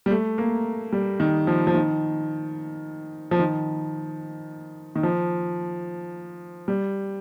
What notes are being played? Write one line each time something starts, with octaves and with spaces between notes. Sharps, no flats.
G3
A3
A#3
G3
D#3
F3
F3
D#3
F3
D#3
D#3
F3
G3